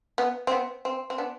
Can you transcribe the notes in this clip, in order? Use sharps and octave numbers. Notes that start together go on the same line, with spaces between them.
B3
C4
B3
C4
C4
B3 D4